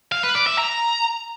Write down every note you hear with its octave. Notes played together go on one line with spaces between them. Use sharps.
F5
B4
D5
E5
A#5